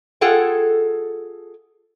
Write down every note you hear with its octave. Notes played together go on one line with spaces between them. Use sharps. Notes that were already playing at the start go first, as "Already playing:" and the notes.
F4 G#4 A4 F#5 G5